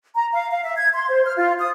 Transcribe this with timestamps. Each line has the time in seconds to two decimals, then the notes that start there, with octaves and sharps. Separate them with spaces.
0.15 A#5
0.33 F5
0.51 F5
0.64 E5
0.77 G#6
0.94 C6
1.10 C5
1.26 F6
1.37 F4
1.59 D#6